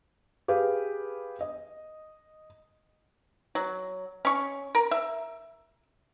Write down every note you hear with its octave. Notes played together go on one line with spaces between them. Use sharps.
G4 G#4 B4 F5
D#5
F#3
C#4 C#6
A#4
E5